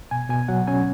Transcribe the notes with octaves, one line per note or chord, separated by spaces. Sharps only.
B2 G#5
B2 G#5
F#3 F#5
C#4 G#5